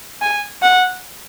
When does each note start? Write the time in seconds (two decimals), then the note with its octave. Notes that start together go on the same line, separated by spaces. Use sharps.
0.22 G#5
0.62 F#5